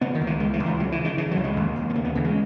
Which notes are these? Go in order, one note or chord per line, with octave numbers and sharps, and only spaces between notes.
C#3 B3
D#3
C#2
E3
C#2 G#3
E3
C#2
E3
C#3 F#3
E3
C#3
D#3
C#3 E3
F#3
C#2
G#3
D#2
D#2
B3
C#3 A#3
B3
C#3 E3
G#3